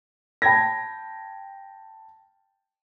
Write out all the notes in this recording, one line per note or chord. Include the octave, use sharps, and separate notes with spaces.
G5 A5 B5 G#6 A#6